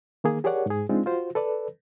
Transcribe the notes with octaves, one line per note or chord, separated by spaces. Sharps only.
D#3 A#3 G#4
G4 G#4 A#4 C#5 D5 F#5
G#2 G#4
G#3 C4 D4 D#4 F4
F4 F#4 C5
A4 B4 D5